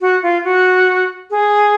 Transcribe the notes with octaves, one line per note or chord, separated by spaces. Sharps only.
F#4
F4
F#4
G#4